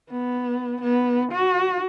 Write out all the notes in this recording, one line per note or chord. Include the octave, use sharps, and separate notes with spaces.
B3
B3
F#4